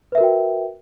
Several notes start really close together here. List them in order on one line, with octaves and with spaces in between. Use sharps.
B4 E5 A#4 F#4 G5